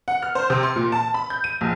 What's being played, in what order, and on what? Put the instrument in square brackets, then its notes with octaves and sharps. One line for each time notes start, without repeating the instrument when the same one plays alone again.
[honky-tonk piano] F#5
F6
C5
C3
C6
A#2
A5
B5
G6
D#7
A#1